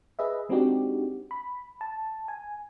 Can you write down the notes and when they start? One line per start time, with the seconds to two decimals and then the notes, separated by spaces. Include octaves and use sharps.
0.19 G#4 B4 D#5 E5
0.49 G#3 C4 D4 D#4 F#4 G4
1.31 B5
1.81 A5
2.28 G#5